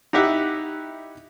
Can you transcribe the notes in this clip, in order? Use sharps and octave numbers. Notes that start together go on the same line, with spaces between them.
D#4 E4 G4 E5 F#5